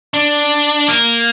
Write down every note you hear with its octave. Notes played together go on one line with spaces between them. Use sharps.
D4
A#3